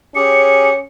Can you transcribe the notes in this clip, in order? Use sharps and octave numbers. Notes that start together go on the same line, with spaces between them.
C#4 G4 G#4 C#7